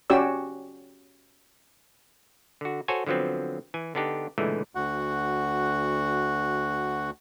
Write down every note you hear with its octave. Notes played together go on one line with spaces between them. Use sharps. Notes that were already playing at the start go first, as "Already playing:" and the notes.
C#4 F#4 G4 D5 E6
D3 F#4
F#4 A4 C5 C#5 G#5
D3 F3 F#3 B3 C4
E3 G#5
D3 B3 D4 D#4 G4
C#2 A#2 D3 E3 G#3 A3
D2 F#4 F#5